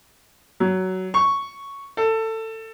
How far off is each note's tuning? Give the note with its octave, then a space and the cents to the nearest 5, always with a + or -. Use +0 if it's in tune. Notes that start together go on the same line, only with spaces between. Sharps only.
F#3 +15
C#6 +0
A4 +20